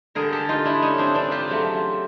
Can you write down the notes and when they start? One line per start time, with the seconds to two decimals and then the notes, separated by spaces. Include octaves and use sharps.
0.15 D3 G3 G#4 A#4
0.32 G4 A4
0.49 D#4 F4
0.65 D4 E4
0.82 C#4 D#4
0.98 C4 D4
1.15 C4 D4
1.31 F4 G4
1.48 C#3 F#3 A3